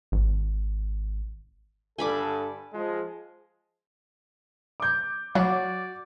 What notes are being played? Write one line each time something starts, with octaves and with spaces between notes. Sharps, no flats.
G#1
G2 D3 A4 G#5 B5 D6
F3 G#3
D6 G6
F#3 F#4 D5